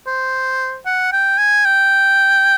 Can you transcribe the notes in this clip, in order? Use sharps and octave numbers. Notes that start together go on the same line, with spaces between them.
C5
F#5
G5
G#5
G5